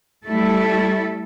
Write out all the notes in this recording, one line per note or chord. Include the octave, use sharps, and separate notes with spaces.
G3 A3 E4 A4